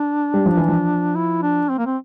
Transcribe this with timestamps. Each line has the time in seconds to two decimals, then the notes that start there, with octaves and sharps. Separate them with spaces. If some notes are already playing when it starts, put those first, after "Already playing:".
Already playing: D4
0.34 G3
0.46 F3
0.57 E3
0.68 F3
1.15 E4
1.42 D4
1.69 C4
1.78 A#3
1.86 C4